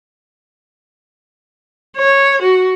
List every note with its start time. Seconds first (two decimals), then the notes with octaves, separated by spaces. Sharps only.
1.97 C#5
2.43 F#4